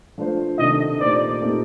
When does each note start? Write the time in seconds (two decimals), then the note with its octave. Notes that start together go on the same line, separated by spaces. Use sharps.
0.18 F3 A3 D4 F4 C5
0.58 C3 D#3 A3 D4 A4 D#5
1.00 A#2 A3 D#4 G4 C5 D5
1.42 A#2 A3 C4 D#4 G4